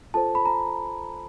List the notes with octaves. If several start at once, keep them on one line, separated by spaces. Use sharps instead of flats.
F4 A4 C5 A5
B5
A#5